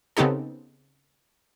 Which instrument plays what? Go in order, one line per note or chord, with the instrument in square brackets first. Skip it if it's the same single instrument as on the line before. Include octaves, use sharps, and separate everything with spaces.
[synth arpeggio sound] C#3 B3 C4 D#4 G4 A4